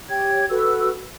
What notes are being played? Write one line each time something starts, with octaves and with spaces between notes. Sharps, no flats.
G4 C#5 G5 G#6
F#4 A4 B4 E6